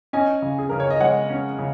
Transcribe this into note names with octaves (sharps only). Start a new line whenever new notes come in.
C#4 D#5 G#5
C#3
G#4
C#3 A#4
C#5
D#5
G#3 C#5 F#5
C#4
C#3